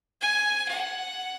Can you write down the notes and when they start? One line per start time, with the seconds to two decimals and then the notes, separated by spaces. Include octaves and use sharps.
0.22 G#5
0.69 F#5